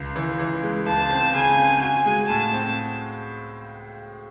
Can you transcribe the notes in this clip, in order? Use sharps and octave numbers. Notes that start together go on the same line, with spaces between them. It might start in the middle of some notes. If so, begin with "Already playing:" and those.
Already playing: C#2
E3
E3
G#3
C#2 A5
C4
C#3 G#5
C4
F#4 G#5
G#3
A2 A5
C4